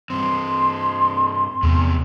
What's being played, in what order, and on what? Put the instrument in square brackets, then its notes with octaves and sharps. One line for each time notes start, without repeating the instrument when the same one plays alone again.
[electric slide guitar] G2 C4 [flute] C6
[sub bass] E2 [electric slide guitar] C3 A3